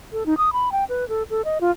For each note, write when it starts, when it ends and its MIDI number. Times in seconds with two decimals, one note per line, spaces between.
0.13 0.26 69
0.26 0.34 63
0.38 0.53 87
0.53 0.72 83
0.72 0.84 79
0.89 1.08 71
1.09 1.23 69
1.30 1.42 69
1.45 1.58 75
1.61 1.71 65